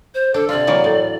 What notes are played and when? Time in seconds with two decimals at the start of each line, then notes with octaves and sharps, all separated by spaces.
0.14 C5
0.34 D4 A4
0.49 C3 F4 D5
0.67 E3 F#3 A#3
0.84 A2